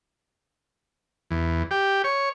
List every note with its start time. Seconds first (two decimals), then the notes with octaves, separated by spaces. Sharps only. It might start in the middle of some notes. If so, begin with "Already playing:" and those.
1.31 E2
1.71 G4
2.04 C#5